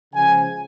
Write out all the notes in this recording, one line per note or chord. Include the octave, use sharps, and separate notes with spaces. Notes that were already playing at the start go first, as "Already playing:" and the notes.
C#3 F3 G#3 G#5